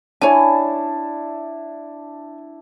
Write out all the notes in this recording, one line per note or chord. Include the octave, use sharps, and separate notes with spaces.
D4 E4 C#5 G#5 A5